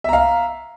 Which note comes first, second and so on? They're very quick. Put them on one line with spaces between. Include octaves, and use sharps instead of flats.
E5 A#5 F5